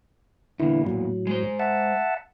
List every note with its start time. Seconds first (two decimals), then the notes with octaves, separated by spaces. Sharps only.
0.60 E2 A#2 D3 E3 E4
0.87 A2 F#3
1.27 G#3 C5
1.60 E5 F#5 A5